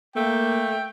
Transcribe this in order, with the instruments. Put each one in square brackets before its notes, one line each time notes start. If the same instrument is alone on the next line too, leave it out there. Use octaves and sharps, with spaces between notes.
[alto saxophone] A3 [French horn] A#3 [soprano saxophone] G5